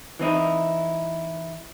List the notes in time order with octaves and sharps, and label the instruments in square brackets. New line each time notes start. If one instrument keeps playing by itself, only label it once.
[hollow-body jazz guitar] E3 C4 D#4 E4